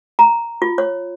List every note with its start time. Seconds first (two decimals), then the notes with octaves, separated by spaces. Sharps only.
0.19 A#5
0.62 F4
0.78 C#5